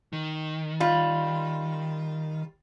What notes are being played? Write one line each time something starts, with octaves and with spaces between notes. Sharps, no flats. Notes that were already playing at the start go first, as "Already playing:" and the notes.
D#3
G3 F4